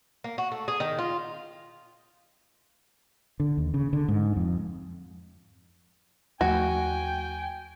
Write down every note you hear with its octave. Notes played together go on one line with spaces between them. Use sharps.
A#3
F#4
A3
G#4
D#3
F4
D3
D#2
C#3
D3
G#2
F2
D#2 F3 A3 F#4 G5 G#5